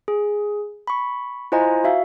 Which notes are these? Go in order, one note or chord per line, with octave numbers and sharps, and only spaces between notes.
G#4
B5 C#6
E4 F4 C5 D#5 G#5 A#5
F#4 E5 F5